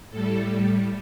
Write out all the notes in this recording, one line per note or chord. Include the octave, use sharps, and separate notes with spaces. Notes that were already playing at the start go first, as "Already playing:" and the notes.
A2 G3 A4